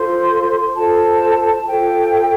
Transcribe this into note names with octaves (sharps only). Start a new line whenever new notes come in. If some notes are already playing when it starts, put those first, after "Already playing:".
Already playing: F4 A4 C5 C6
F4 A4 C5 A5
F4 A4 C5 G5